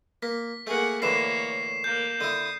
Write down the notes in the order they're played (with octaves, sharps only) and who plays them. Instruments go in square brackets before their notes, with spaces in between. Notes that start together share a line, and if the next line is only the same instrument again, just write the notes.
[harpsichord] A#3 [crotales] B6
[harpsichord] A3 A#3 [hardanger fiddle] G#4 F#5
[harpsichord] A2 D3 E3 [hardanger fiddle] A#3 C#5 [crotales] C7 E7
[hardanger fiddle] A#3 [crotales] G6
[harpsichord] D3 E4 [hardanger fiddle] D#6